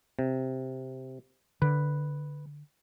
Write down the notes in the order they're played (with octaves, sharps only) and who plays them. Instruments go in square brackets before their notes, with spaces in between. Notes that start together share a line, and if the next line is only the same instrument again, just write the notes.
[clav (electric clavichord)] C3
[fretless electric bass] D3 [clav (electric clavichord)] B4